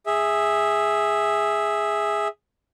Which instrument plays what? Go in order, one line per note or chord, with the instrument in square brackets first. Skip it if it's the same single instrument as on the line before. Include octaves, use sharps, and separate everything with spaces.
[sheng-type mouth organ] G#4 E5